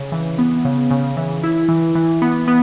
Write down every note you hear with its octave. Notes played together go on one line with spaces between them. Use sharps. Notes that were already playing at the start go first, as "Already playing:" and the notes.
Already playing: C#3
E3
B3
C#3
C#3
E3
E4
E3
E3
B3
B3